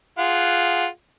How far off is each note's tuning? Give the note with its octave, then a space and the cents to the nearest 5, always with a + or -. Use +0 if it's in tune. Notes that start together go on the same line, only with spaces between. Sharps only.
F4 +0 G#4 +0 F#5 +0